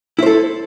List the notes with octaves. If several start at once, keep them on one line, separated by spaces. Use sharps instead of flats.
E4 A4 C5